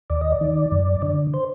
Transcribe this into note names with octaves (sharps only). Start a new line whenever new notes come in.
D#2 D5
D#5
D5
D#3
F#2
D3
C5